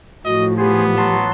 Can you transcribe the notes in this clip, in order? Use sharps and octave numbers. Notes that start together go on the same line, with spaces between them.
A2 F3 F#4 D#5
B3 G4 G#4 C5
F#3 A5 C6